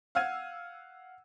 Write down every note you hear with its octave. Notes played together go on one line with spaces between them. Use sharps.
F5 F#5 E6 F6 G#6 D#7